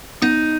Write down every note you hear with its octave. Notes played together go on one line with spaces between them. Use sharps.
B3 D#4